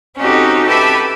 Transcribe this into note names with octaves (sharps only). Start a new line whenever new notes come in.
C4 C#4 D#4 F#4 G4 A4
G4 A4 B4 E5 A5 B5